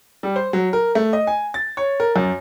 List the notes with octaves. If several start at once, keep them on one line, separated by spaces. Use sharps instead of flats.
G3
C5
F#3
A#4
A3
D#5
G#5
A6
C#5
A#4
F#2